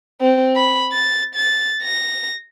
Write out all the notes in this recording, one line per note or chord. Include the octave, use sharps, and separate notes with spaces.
C4
B5
A6
A6
A#6